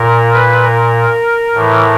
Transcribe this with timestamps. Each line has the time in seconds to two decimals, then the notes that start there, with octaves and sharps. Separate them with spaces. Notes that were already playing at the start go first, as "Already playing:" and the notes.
Already playing: A#2 A#4
0.34 B4
0.64 A#4
1.54 A2 E3